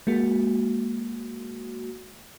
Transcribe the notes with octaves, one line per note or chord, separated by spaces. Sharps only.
G#3 A#3 F#4